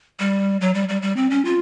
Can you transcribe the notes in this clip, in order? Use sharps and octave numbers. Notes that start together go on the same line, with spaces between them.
G3
F#3
G3
G3
G3
C4
C#4
F4